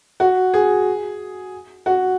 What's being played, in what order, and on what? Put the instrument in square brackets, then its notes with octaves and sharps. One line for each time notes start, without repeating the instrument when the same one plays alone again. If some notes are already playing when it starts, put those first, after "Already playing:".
[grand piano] F#4
G#4
F#4